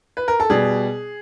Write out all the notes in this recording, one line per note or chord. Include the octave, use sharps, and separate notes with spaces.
B4
A#4
A4
B2 G3 G#4